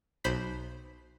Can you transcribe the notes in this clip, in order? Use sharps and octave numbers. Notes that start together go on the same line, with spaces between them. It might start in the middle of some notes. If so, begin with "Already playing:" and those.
B1 C5 B5 B6